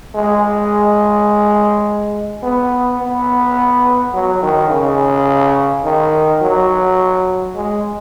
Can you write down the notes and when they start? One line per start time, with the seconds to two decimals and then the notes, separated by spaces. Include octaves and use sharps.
0.15 G#3
2.43 B3
3.00 B3
4.14 F#3
4.43 D#3
4.70 C#3
5.85 D#3
6.42 F#3
7.56 G#3